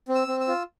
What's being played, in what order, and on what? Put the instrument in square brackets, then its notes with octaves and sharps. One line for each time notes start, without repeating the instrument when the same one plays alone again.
[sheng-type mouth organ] C4
E6
C4
E6
F4